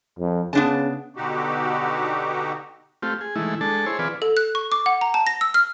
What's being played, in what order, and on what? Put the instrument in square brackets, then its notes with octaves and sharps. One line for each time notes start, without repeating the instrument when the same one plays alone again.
[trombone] F2
[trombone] C#3 [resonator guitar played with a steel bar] B3 D4 A5
[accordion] B2 D3 D#4 F#4 G4
[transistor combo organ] A3 C4 F4 G4
G#4
D#3 E3 G#3 A3 E4
G#3 D4 A4 A5
E4 G#4 C5 C#5
E3 C4 F4 G#4 B4 D5
[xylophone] A4
F#6
C#6
D6
F#5
A#5
A5
A#6
E6
F6